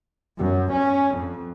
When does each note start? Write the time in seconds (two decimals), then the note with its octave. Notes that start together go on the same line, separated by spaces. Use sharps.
0.38 F#2
0.71 C#4
1.16 F2